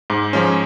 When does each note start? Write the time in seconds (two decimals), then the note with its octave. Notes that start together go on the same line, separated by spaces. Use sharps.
0.10 G#2
0.33 F3 G#3 C#4